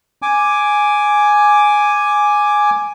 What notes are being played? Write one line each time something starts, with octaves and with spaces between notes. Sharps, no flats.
G#5 D6